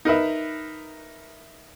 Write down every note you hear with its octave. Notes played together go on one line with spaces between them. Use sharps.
D#4 A#4 B4 E5